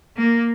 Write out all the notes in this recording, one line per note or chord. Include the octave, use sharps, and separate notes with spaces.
A#3